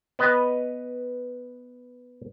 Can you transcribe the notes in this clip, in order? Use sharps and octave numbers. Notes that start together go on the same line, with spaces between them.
B3 B4 D#5